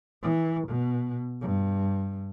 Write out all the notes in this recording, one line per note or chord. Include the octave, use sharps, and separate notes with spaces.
E3
B2
G2